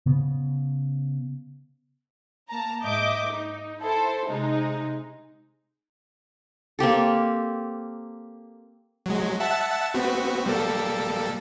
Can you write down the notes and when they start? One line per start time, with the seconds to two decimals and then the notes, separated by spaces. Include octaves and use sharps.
0.06 C#3 B3
2.49 A#3 A5 A#5
2.83 G#2 D#5 E5 D6 G6
3.29 D#4
3.81 E4 A4 C5
4.26 C3 G#3 D#4
6.79 A#3 C4 G4 A4
9.06 F#3 G#3
9.40 E5 F#5 A5
9.94 B3 C4 F#4
10.46 G3 A#3 A4